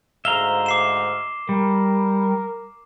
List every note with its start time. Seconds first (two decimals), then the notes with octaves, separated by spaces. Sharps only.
0.25 D2 G#2 E5 F5 A#5 G7
0.66 D6 C7 E7
1.49 G3 A#4